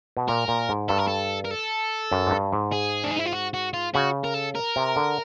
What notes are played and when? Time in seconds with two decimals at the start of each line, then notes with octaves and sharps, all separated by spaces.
0.17 B2
0.28 A#2 A#4
0.48 A#2
0.69 G#2
0.89 G2 A4
0.98 A#4
1.07 A4
1.45 A#4
1.51 A4
2.12 F#2
2.27 G#2
2.31 G2
2.53 G#2
2.72 G#4
3.04 D4
3.11 D#4
3.19 E4
3.26 F4
3.33 F#4
3.54 F#4
3.74 F4
3.95 C#3 F#4
4.24 A#4
4.34 A4
4.55 A#4
4.76 C3
4.96 D3